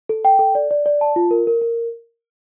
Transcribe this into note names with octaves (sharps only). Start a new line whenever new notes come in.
A4
G5
A4
D5
D5
D5
A5
F4
A#4
A#4
A#4